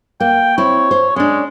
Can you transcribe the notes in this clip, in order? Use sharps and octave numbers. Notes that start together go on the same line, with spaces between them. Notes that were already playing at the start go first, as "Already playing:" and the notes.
A#3 G5
C4 E4 C#5
C5
G#3 C#4 D4